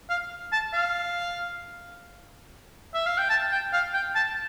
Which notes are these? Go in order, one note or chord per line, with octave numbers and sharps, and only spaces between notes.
F5
A5
F5
E5
F5
G5
A5
G5
F5
G5
A5